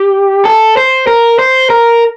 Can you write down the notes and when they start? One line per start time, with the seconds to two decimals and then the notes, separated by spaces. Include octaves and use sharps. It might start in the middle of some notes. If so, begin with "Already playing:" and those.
Already playing: G4
0.45 A4
0.77 C5
1.07 A#4
1.39 C5
1.70 A#4